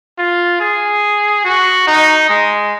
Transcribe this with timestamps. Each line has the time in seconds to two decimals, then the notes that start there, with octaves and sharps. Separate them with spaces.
0.19 F4
0.60 G#4
1.45 F#4
1.87 D#4
2.29 G#3